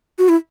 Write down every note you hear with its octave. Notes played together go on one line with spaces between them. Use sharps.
F#4
E4